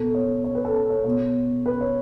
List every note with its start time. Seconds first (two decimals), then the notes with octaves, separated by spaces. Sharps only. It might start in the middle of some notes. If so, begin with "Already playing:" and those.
Already playing: B2 A4
0.15 C#5
0.44 C#5
0.55 B4
0.65 A4
0.75 A4
0.90 C#5
1.04 B2 C#5
1.66 B4
1.81 C#5